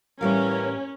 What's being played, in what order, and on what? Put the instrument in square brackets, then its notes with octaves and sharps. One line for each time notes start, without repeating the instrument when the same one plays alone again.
[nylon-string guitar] A2 G3 F5 [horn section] E3 A#4 [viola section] C#4